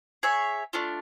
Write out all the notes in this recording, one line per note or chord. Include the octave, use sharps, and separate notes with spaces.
G#4 C#5 E5
A3 D4 F4